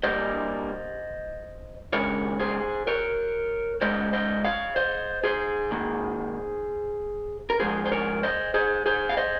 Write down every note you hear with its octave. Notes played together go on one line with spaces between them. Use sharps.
G2 G3 A#3 C5 D#5
D#2 C#3 G#3 A#4 C#5
G#4 C5
A#4 C#5
C#2 C#3 G#3 C5 D#5
C5 D#5
C#5 F5
C5 D#5
G#4 C5
G#2 D#3 A#3
A#4
G#2 F3 G#3 G#4 C5
C5
A#4 C#5
C5 D#5
G#4 C5
G#4 C5
F5
C5 D#5